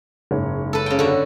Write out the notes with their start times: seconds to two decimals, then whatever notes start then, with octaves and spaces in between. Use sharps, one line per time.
0.31 F#1 G#2 C#5
0.73 A4 B4
0.86 C#3 G5
0.99 D3 F#4